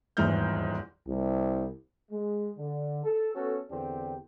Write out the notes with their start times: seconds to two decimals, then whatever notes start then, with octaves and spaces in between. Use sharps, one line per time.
0.17 D#1 E2 G#2 E3 F6 G6
1.08 C2
2.11 G#3
2.57 D3
3.04 A4
3.35 B3 C#4 F#4 A4
3.71 E2 D3 C4 D4 G4